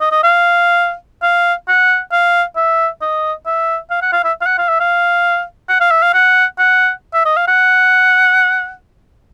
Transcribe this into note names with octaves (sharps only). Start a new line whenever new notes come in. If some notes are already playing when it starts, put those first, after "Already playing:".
D#5
D#5
F5
F5
F#5
F5
E5
D#5
E5
F5
F#5
F5
E5
F5
F#5
F5
E5
F5
F#5
F5
E5
F5
F#5
F#5
E5
D#5
F5
F#5